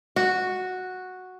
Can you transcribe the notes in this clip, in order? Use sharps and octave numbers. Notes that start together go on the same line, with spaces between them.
F#4